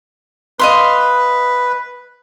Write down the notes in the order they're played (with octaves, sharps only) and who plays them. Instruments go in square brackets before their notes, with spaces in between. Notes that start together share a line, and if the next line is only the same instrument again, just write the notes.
[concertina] B4 [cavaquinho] D#5 F5 C6